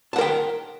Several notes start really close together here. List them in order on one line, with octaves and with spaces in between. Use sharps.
A5 F#5 A#4 G5